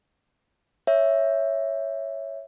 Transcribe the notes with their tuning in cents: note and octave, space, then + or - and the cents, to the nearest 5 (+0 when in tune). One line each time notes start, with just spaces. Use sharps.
C#5 +0 E5 +0